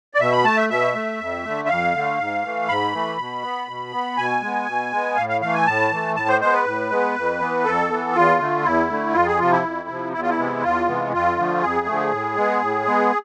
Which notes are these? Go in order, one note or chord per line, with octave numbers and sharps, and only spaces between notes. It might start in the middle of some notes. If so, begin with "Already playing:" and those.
D5
B2 E5
B5
A3 A5
E5
B2 E5
A3
F2
D3 A3
E5
F2 F5
D3 A3
G#2
E3 A3
G#2 B5
E3 A3
B2
B3
B2
B3
B2 G#5
G#3 B3
B2
G#3 B3
A2 F5
F5
E3 A3 F5
G#5
A2 A5
E3 A3
A2 A5
C5
G#3 B3 C5
B4
A2
G#3 B3
F2
E3 B3
F2 A4
E3 B3
E2 F4
D3 A3
E2 E4
D3 A3
F2 F4
G#4
C3 F3 F4
E4
F2
C3 F3
E2 E4
F4
E4
C3 E3 G#3 B3
E2 F4
C3 E3 G#3 B3
F2 F4
D3 F3 A3
F2 G#4
D3 F3 A3
A2
G#3 B3
A2
G#3 B3